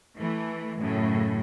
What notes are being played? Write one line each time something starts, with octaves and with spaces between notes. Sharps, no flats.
E3 A3
F#2 A2 C#3